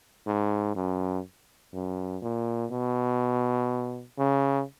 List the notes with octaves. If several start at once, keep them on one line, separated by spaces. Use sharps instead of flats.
G#2
F#2
F#2
A#2
B2
C#3